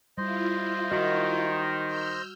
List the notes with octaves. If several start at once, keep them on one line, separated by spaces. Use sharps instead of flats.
G3 E4 F4 C5 D#5
D#3 F#4
E6 F6 G6